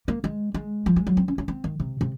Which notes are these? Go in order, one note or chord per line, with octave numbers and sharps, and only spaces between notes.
A#3
G#3
G#3
F3
G#3
F#3
C4
C#4
C#4
C4
D#3
C3
C3